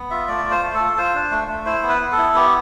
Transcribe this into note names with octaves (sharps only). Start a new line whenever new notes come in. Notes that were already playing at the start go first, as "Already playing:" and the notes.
Already playing: B3
F4 E5
A3 D5
F4
C5
A3
A4
F4
F4 C5
D4
A3
A3
E4 C5
B3
B4
B3
A4
E4
B3 G4